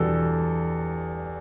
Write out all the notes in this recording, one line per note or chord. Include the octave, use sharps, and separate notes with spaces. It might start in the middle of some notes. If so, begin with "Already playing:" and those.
Already playing: E2 B2 G3 D4 A4